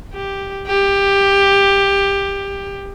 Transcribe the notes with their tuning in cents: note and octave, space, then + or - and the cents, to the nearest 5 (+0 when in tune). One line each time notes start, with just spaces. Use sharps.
G4 +5
G4 +15